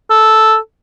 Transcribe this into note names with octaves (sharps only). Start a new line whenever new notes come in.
A4